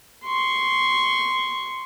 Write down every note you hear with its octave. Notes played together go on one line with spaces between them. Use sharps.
C6 C#6